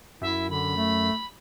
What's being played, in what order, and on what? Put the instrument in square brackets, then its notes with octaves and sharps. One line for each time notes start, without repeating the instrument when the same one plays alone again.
[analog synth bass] F#2 [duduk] E4 [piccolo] E5
[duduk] D3 [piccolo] B5
[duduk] A3